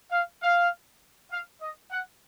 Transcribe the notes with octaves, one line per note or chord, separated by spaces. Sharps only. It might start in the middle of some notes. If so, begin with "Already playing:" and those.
F5
F5
F5
D#5
F#5